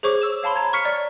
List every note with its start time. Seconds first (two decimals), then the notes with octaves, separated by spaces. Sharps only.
0.03 G#4 C5 C#5 C#6 D6
0.22 E6 E7
0.43 C#5 F5 A5 B5 C6
0.56 A#5 G#6
0.73 C#6 F6 B6 C#7
0.85 D5